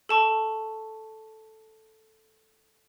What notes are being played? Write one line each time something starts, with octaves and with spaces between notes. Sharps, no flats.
A4 A5 C#6